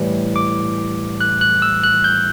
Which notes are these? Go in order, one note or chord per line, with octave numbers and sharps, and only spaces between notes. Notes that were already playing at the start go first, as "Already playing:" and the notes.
Already playing: A2 E3 G3
D6
F#6
F#6
E6
F#6
G6